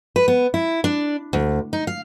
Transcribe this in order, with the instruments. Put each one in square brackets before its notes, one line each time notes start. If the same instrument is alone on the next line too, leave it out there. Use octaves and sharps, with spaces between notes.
[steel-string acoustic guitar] B4
B3
E4
D4
D2
D#4
F5